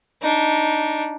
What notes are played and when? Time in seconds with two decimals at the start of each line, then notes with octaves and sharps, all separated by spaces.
0.22 D4 D#4